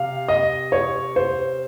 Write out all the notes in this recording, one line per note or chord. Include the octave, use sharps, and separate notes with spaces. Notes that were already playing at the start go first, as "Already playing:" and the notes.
Already playing: C3 F5
D#5
C#5
C5